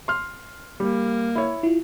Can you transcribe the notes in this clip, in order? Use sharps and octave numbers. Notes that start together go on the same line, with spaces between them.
C6 F6
G3 A#3
E4 C#5
E4 F4